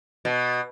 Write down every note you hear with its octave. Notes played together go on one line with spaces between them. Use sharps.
B2